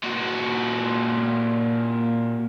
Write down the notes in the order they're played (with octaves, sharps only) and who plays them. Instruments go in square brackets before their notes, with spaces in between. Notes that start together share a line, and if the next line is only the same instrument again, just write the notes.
[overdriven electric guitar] A#2 F#4